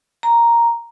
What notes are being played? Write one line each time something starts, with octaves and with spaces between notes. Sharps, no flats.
A#5